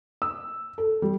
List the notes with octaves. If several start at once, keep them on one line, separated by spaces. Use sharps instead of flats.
E6
A4
G3